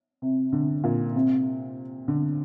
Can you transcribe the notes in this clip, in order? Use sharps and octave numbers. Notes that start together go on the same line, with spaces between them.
C3
D3
A#2
C3
D3